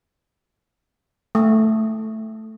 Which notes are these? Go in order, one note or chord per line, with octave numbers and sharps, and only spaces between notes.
A3